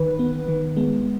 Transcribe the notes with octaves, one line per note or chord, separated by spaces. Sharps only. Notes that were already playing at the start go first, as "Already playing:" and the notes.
Already playing: D#3 B4
B3
D#3
G#3 B3